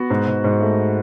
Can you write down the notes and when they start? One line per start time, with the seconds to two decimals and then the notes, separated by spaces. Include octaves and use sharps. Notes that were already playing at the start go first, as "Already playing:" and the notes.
Already playing: B3 F#4
0.10 G#2
0.27 G#2
0.44 G#2
0.61 A3